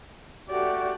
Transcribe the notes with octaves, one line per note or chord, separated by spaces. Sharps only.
A3 F#4 G4 D5